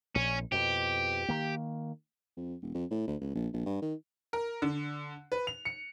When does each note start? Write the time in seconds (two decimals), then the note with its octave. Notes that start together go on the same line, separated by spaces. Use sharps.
0.15 A#1 C#4
0.52 F2 B2 G4
1.29 D#3 A#3
2.37 F2
2.62 E1
2.74 F2
2.91 A2
3.08 D2
3.21 C#2
3.35 A#1
3.53 A#1
3.66 G2
3.82 D#3
4.33 A#4
4.62 D3
5.32 B4
5.47 F7
5.65 C#7